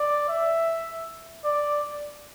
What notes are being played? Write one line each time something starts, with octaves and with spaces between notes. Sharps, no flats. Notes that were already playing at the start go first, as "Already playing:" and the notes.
Already playing: D5
E5
D5